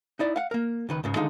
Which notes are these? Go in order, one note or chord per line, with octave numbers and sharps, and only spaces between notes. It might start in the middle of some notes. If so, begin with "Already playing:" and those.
D#4 E4 D5
F5 F#5
A#3 A#4
C#2 D#3 B4
C#2 G#2 C#3
D3 D#3 G#3 D#4 F5